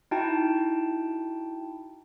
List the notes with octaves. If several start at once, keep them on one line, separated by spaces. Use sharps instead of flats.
D#4 E4 F#4 G5 A5